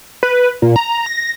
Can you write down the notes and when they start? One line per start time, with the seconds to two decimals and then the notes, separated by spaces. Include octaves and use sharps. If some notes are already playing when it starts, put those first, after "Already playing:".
0.23 B4
0.62 A#2
0.76 A#5
1.06 A#6